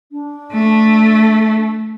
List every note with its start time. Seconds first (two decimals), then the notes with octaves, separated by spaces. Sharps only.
0.11 D4
0.53 A3